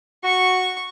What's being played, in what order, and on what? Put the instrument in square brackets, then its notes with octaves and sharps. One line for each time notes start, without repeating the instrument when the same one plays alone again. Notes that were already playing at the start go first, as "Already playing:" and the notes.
[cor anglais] F#4 [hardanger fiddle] C#6